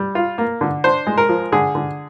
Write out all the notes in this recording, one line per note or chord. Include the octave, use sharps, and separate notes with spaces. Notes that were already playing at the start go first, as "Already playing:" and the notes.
Already playing: G3
F4
A#3
D3
D4 C5
G#3
A#4
F3
D3 G#4
D3